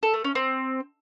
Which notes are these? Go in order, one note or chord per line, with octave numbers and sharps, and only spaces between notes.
A4
A3
C#4
C4